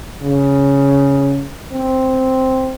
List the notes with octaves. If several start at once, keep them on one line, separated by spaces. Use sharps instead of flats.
C#3
C4